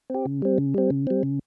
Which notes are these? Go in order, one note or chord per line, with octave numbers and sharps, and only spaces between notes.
C4 G4
C#3
G3 C4
C#3
G3 C4
C#3
G3 C4
C#3